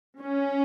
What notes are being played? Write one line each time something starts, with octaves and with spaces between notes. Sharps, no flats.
C#4